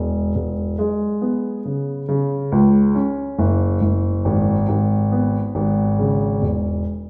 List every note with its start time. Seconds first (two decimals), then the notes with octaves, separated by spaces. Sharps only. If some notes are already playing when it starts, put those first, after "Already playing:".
Already playing: E1 G#3
0.35 E1
0.79 G#3
1.22 B3
1.65 C#3
2.09 C#3
2.52 C#2
2.95 C#4
3.39 F#1
3.82 F#1
4.25 G#1
4.69 G#1
5.12 B3
5.55 G#1
5.99 C#3
6.42 E1